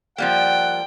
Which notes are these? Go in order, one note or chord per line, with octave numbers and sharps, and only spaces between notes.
F3 G3 A#3 F#5 G5